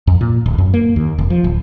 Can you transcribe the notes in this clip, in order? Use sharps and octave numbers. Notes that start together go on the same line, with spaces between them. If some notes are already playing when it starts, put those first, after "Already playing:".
F2
A#2
D1
F#2
A#3
D#2
F1
F3
D1